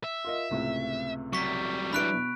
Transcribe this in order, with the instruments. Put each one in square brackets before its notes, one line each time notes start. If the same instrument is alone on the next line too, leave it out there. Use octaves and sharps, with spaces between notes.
[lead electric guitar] E5
[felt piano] F4 A#4 D#5
C#2 A2 C3
[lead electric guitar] F#3 G3 [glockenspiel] C#6 B6
[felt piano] D4 E4 B4 [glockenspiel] B5 F#6 D7
[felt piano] B2